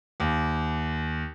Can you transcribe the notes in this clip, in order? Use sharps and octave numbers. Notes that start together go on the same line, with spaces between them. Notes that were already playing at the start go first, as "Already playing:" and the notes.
D#2